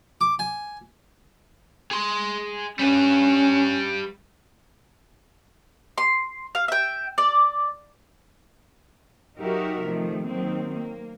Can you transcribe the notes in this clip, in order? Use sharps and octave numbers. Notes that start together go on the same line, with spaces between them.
D6
G#5
G#4 C6
G3 C#4 B4
C6
F5
E5 G5
D5
F#3 D#4 F#4 G4 A#4 E5
C3 D#3 F3 A3
D#3 F#3 A#3 C4
A#3